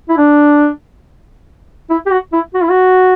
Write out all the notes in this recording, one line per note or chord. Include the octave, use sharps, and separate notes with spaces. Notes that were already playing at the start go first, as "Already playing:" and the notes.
E4
D4
E4
G4
F#4
E4
F#4
E4
F#4